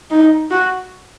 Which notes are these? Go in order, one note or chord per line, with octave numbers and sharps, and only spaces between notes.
D#4
F#4